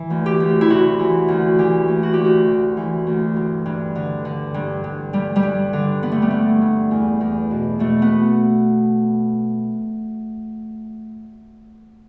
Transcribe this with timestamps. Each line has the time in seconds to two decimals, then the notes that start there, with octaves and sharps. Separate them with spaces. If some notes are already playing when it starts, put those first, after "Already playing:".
Already playing: E3
0.10 D2
0.26 G4
0.40 D2
0.61 E4
0.70 C3 F#4
0.99 E3
1.28 D2
1.58 E3 G4
1.88 D2
2.03 F#4
2.13 D2 G4
2.25 F#4
2.47 C3
2.77 E3
3.07 D2
3.36 G2
3.66 G2
3.95 D3
4.25 D3
4.54 G2
4.84 G2
5.13 G2 G3
5.36 G3
5.43 G2
5.73 D3
6.02 D3 B3
6.12 A3
6.22 G3
6.31 G2 A3
6.61 G2
6.91 E2
7.21 E2
7.51 B2
7.79 B2 A3
8.02 B3